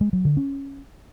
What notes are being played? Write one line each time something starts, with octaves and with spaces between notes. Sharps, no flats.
G#3
F#3
D3
C#4